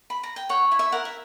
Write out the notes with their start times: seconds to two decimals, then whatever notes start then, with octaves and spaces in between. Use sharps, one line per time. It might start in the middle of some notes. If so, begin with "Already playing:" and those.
0.10 B5
0.23 A#5
0.36 G5
0.49 C#5 F#5
0.72 E4
0.79 E5
0.92 A#4 F#5
1.05 E5